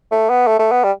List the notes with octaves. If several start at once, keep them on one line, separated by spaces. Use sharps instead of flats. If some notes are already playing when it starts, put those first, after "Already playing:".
A3
B3
A3
A3
B3
G3